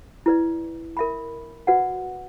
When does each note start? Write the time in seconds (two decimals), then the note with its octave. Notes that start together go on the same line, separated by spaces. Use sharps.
0.26 E4 B4 D5
0.97 A#4 E5 B5
1.67 F#4 B4 D5 F#5